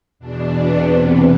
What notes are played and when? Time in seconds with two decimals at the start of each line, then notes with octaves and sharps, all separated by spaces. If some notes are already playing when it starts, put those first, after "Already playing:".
0.19 E2 B2 D4
0.53 B3
0.86 E2 C3 E3 C4